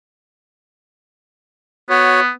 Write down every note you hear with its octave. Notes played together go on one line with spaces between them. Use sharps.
B3 F#4 C#5